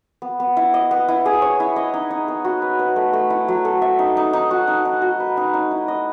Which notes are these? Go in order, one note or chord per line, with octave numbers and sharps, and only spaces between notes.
B3
B3
E4
D#5
B3
E4
G#4
C#5
E4
D#5
D#4
D#4
B3
F#4
B4
B4
A3
A3
E4
F#3
A4
E5
D#4
D#4
D#4
F#4
D#4
D#4
F#4
B4
D#4
D#4
E4
D#5